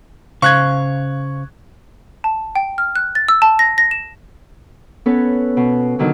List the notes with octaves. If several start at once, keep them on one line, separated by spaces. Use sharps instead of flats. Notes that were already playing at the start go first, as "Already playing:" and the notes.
C#3 C5 F5 C#6 F#6 G#6
A5
G5
F6
F#6
A6
E6
A5
A#6
A#6
E7
B3 C#4 A4 B4 C#5
B2
B2 D3 D#3 F#3